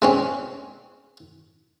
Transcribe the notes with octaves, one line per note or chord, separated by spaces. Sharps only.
G#3 C4 C#4